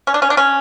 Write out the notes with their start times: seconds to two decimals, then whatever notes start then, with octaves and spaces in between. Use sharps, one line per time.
0.07 C#4
0.14 D4
0.22 C#4
0.30 D4
0.37 C#4